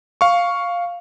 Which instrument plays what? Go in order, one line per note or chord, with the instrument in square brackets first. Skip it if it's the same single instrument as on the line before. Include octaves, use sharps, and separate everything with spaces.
[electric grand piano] F5 C#6